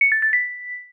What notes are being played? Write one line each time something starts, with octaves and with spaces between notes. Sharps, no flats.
C#7
A6
A6
B6